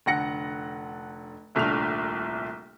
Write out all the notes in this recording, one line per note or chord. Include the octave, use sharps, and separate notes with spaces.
F1 D3 F#5 A#6 C#7
D#1 C2 A3 D4 F6 F7